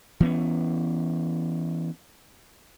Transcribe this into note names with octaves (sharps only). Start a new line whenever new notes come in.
E3 B3 C#4